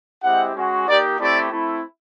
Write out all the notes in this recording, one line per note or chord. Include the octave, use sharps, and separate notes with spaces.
G#3 C4 E4 G4 F#5
G#3 C#4 F#4
A#3 D#4 G4 D5
A3 C4 E4 G4 D5
A3 C4 E4